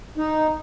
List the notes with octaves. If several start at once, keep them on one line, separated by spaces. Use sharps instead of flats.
D#4